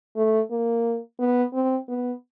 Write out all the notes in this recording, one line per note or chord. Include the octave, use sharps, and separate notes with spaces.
A3
A#3
B3
C4
B3